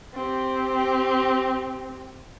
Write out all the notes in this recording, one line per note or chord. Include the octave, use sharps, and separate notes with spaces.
C4 G4